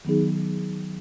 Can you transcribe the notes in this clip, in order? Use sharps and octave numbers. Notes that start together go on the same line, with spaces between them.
D#3 F#3 B3 D#4 G#4